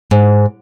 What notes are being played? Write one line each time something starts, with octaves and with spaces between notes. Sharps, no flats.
G#2